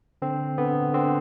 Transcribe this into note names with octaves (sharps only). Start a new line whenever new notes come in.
D3 C4
D3 B3
D3 C4